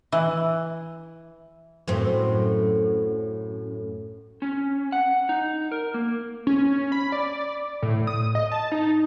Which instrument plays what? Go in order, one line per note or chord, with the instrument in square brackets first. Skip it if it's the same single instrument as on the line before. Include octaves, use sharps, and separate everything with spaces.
[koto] E3
[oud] F#2 A2 C4
[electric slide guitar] C#4
F#5
D#4
A#4
A#3
[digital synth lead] C#4
B5
D5
A2
D#6
D#5
A5
D#4